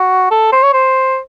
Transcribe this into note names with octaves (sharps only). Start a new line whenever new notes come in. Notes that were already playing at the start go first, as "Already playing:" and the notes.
Already playing: F#4
A4
C5
C#5
C5